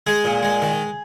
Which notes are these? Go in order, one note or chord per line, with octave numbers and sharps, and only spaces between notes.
G#3 G#4
A#2
G#3
D#3